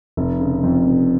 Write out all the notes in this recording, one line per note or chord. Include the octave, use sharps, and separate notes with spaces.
F1
C#3
F2
F1